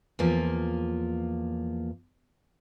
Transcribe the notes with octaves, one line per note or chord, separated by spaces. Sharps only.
E2 F3 A#3 F4